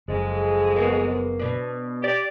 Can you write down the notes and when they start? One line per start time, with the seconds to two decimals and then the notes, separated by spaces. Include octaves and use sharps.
0.08 F#1 F2 G#3
0.76 A#3 B3 F#4
1.39 B2 D4
2.02 G4 D5